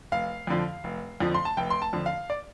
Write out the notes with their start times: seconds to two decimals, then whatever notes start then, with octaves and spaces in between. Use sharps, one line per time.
0.12 F1 F5
0.47 F2 D3 F3
0.84 F1
1.20 F2 D3 F3
1.34 C6
1.45 A5
1.57 F1 G5
1.70 C6
1.82 A5
1.93 F2 D3 F3
2.06 F5
2.30 D5